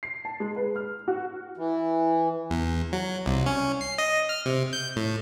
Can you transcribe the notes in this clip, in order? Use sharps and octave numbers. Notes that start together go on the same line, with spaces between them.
C7
A5
G#3
B4
F6
F#4
E3
E2
F#3
C2
C#4
C7
D#5
F6
C3
G6
A2